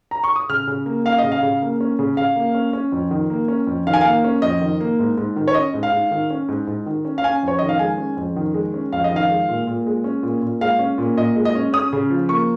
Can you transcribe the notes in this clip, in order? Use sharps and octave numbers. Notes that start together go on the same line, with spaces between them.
A#5
C#6
D#6
C#3 F6
C#3
A#3
C#4 F5
D#5
C#3
F5
C#3
A#3
C#4
C#3
C#3 F5
A#3
C#4
C#4
F2
D#3
A#3
C#4
F2
D#3 F5
G#5
A#3 F5
C#4
F2 D#5
D#3
A#3
G#2
G#2
D#3
C#5
C#4 D#5
G#2
F5
G#2
D#3
C#4
G#2
G#2
D#3
C#4
F5
C#4 G#5
F2 C#5
D#3 D#5
F5
G#3 G#5
C#4
F2
D#3
G#3
C#4
F2 F5
D#5
D#3 F5
G#3
A#2
A#2
G#3
C#4
A#2
A#2
G#3 F5
C#4
A#2
A#2 D#5
G#3
D#5
C#4
C#4 D#6
C#3
F3
A#3 C#6